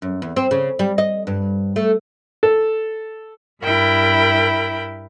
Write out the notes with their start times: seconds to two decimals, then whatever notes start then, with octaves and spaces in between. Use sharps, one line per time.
0.02 F#2
0.22 E2
0.36 C4
0.51 C#3
0.79 G3
0.98 D#5
1.27 G2
1.76 A3
2.43 A4
3.63 G2 E4 A#4 G5 B5